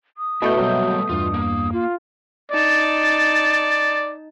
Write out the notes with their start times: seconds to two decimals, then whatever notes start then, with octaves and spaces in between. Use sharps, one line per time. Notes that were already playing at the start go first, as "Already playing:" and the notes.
0.17 D#6
0.42 B2 A3 E4 A4 G6
0.57 F#3 G3 A#3 B3 A4
1.09 E2 G2 F4
1.34 A#3
1.73 F4
2.51 D#4 D5 A5